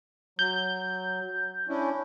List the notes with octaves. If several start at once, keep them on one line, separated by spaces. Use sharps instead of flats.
F#3 G6
C#4 D4 E4